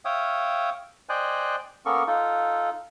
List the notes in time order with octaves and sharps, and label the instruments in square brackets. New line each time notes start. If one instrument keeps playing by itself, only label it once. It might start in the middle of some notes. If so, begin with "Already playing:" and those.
[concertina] C#5 E5 F5 G5 D#6
C5 D5 D#5 G5 G#5 F#6
A#3 B3 C#4 A4 A#4 C#6
D#4 F4 A4